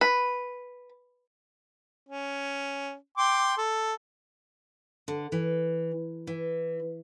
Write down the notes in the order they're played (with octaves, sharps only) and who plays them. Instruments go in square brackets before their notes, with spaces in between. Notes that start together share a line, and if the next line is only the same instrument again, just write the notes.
[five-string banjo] B4
[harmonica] C#4
G5 C6 D6
A4
[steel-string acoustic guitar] D3
E3
E3